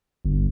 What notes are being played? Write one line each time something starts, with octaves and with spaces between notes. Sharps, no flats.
G1